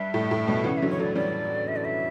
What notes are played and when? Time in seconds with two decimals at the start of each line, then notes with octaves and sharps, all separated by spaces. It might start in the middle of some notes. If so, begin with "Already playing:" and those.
Already playing: G2 E5
0.14 A2
0.31 A2
0.47 G2 B2
0.64 C#3 E3 F#5
0.77 E5
0.82 D3 F#3
0.90 C#5
0.99 F#3 A3 D5
1.15 E3 G3 D5
1.68 E5
1.76 D5
1.84 E5